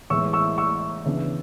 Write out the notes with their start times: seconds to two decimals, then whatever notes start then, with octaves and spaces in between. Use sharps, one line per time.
0.10 A2 E3 G#3 B3 C#6 E6
0.33 C#6 E6
0.58 C#6 E6
1.05 C#3 E3 B3 D4